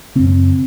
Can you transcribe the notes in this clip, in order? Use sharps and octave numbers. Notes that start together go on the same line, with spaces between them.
F#2 C#3 C4